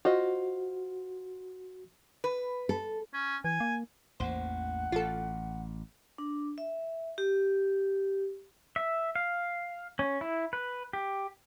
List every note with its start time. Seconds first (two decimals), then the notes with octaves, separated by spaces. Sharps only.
0.05 F4 F#4 C5 D#5
2.24 B4
2.69 A4
3.14 C#4
3.44 E3 G#5
3.60 A#3
4.20 A1 E2 A#3 C5 F#5
4.92 A1 F4 A4
6.18 D4
6.58 E5
7.18 G4
8.76 E5
9.15 F5
9.99 C#4
10.21 E4
10.53 B4
10.93 G4